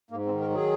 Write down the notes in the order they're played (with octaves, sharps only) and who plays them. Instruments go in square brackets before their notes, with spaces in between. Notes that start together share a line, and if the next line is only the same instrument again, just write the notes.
[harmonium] G#2 A#3
C4
D#3
A#4
F#3 G#4